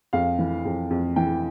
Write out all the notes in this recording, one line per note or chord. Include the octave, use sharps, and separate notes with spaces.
F2 F5
E3
F2
F2
E3 G5